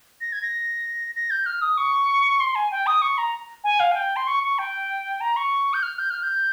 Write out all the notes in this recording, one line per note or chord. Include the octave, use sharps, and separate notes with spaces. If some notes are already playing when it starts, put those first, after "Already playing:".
A#6
G#6
A#6
A#6
G6
F6
D#6
C#6
C6
G#5
G5
D#6
C#6
A#5
G#5
F5
G#5
G5
C6
C#6
C#6
G5
A#5
C#6
G6
F6
G6
F6
G6